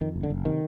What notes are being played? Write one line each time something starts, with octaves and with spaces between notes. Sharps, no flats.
F2 D#3
F#1
D3
F#1
C3 D#3